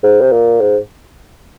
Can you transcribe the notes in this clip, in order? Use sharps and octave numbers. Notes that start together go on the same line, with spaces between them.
G#2
C3
A#2
G#2